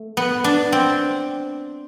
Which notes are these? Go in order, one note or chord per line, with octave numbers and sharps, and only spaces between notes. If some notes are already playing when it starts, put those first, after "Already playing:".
Already playing: A3
B3
D4
C4